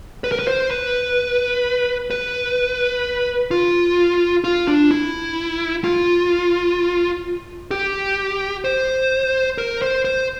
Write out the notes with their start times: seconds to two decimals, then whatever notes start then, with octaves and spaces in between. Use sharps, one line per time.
0.24 B4
0.32 A#4
0.39 B4
0.47 C5
0.71 B4
2.11 B4
3.51 F4
4.44 F4
4.68 D4
4.91 E4
5.84 F4
7.71 G4
8.64 C5
9.58 A#4
9.82 C5
10.05 C5